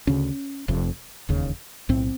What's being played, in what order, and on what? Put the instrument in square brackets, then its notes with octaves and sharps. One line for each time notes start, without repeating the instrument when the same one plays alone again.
[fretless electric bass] D2 C#3 C#4
F1 F2 C3
E1 D#2 C#3
B1 A2 C4